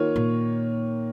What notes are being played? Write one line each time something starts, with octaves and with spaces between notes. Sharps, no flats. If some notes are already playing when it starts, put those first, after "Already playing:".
Already playing: D#3 A#3 F4 C#5
A#2